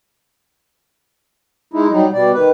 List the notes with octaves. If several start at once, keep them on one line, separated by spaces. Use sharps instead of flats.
G#3 D#4 E4
F#3 G3 D#4
B2 G3 D5
D#3 B4